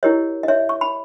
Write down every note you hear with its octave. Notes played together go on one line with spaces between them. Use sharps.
E4 G4 A#4 C#5 D#5
D#5
C#5 E5
C#6
B5